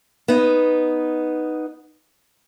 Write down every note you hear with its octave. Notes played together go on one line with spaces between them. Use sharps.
B3 D#4